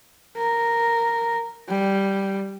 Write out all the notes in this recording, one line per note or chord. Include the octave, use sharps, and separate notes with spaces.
A#4
G3